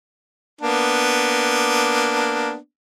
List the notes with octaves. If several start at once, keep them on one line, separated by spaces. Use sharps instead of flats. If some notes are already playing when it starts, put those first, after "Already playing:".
A#3 B3 D4